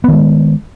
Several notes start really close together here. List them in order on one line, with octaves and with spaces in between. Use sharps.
B3 D#3 G#3